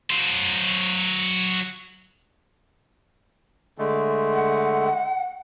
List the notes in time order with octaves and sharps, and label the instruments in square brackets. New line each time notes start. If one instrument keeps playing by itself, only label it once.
[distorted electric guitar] F#3 C5
[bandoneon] D3 G#3 A3
[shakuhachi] F#5